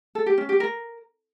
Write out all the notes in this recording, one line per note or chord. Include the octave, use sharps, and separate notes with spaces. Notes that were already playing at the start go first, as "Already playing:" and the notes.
A4
G4
C#4
G4
A#4